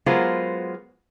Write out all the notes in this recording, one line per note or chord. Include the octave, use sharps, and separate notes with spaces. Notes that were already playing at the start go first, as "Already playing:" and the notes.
F#3 G#3 B3 F4 A#4 C5